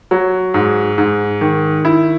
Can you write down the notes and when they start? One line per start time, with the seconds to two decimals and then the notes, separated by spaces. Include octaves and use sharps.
0.11 F#3
0.54 G#2
0.98 G#2
1.41 D#3
1.85 E4